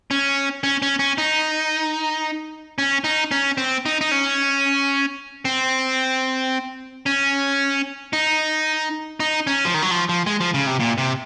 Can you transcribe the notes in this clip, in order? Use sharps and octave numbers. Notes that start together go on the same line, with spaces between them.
C#4
C#4
C#4
C#4
D#4
C#4
D#4
C#4
C4
D#4
D#4
C#4
C4
C#4
D#4
D#4
C#4
F3
D#3
F#3
F3
F3
G#3
F3
C#3
C3
A#2
C3